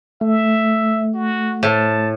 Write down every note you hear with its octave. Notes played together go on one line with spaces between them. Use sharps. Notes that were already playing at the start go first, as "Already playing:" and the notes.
A3 E5
F#4
A2 A5